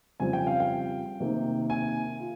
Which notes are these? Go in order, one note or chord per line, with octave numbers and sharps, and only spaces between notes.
F2 C#3 G3 C4 F4 G#5
G5
F5
G5
C3 D#3 A#3
G#5
F4